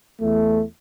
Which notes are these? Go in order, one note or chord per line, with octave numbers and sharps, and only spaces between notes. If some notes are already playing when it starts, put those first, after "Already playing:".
E2 A3